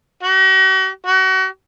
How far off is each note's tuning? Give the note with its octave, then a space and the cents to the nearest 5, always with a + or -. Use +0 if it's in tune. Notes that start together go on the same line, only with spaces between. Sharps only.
F#4 +45
F#4 +35